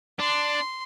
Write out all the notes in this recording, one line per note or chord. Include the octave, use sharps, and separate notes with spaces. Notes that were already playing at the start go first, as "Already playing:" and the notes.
D4 C6